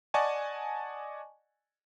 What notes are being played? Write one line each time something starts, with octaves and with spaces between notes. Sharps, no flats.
D5 D#5 F#5 G#5 A5 C#6